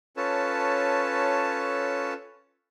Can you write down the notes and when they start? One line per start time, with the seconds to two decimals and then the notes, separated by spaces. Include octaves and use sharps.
0.17 C#4 F4 A4 B4 C#5 A5